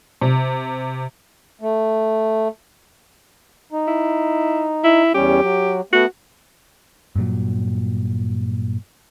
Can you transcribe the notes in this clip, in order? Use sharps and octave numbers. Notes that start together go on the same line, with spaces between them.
C3
A3
D#4
E4
E4
E2 G3 C#4 G4
F#3
A3 B3 F#4
G2 A#2 F#3